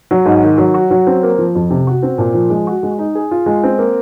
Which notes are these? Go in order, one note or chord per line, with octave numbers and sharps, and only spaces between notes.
F#3
G#2
D#3
F#3
F#4
F#3
C4
A#3
F3
F2
C3
F#4
C4
A#2
F3
G#3
F#4
G#3
D#4
G#4
F4
G#3
C4
A#3